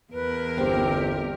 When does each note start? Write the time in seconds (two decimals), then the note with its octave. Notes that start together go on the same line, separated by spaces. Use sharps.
0.12 E2 A#4 B4
0.58 G1 C4 G4